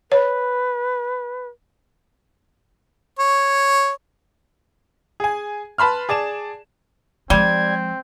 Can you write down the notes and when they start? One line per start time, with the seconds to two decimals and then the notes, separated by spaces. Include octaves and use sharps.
0.12 B4 C#5
3.19 C#5
5.20 G#4 G#5
5.78 B4 A5 B5 C6 F6
6.09 G#4 D5 A5 E7
7.30 F3 G3 G#3 C4 G#6